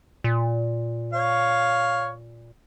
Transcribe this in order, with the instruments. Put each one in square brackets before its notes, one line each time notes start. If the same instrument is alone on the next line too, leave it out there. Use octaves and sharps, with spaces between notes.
[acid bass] A#2
[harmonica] C#5 F5